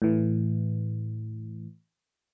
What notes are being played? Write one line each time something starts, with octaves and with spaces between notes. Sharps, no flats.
A2 E3